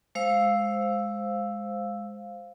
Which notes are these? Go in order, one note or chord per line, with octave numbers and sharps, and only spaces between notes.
G#3 C5 F5 E6